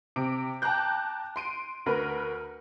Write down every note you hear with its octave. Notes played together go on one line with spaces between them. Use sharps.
C3 D6 D7
G5 A5 A#5 D6 F#6 G6
C6 D7 D#7
D2 A#4 B4